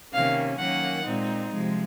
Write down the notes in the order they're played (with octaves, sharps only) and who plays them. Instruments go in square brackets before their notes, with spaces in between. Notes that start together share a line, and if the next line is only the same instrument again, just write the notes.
[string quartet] C3 D#3 A#3 C#4 F5
D#3 F#3 A#3 C#4 F#5
A#2 G#3 C4 D#4
C3 F3 G#3